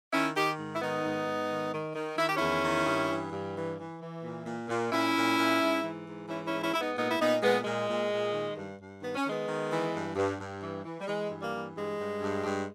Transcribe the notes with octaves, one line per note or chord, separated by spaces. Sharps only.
D#3 C#4 E4
D#3 D#4 G4
G#2
E4
D#3 B3 D#4
G#2
G#2
D#3
D#3
D#3
D#3 E4
G4
E2 C#4 E4
D#3
G2
E3
G2
E3
E3
E3
A#2
A#2
A#2
A#2 C#4 E4
A#2
A#2
G#2
E3
G#2
E3 C#4 E4
C#4 E4
G#2
C#4 E4
G#2 E4
B3 D#4
A#2 B3 D#4
E4
A#2 B3 D#4
A#2 G#3 B3
A#2 G#3
A#2
A#2
D#3
G2
G2
D#3 B3
C#4
D#3 G#3 B3
D#3
E3
G2
G2
G2
E3
E3
G3
E3 G#3
G2
G3 A#3
E3
G2 G#3
G2
G2
G2